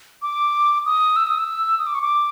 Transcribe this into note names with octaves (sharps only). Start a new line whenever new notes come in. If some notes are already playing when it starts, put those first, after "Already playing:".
D6
D#6
E6
D#6
E6
D#6
D6
C#6
D6